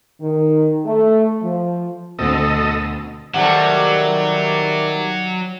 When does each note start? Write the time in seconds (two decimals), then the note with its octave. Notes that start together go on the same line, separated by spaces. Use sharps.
0.20 D#3
0.84 A3
1.41 F3
2.19 D2 B2 D3 C4 A4 D#5
3.34 C3 D#3 F#3 G3 A3 D5 F#5 G5